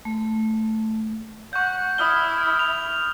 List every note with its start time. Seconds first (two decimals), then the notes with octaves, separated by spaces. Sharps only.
0.05 A3
1.53 F#5 C#6 G6
1.98 E4 D#6 F6 G7
2.59 F7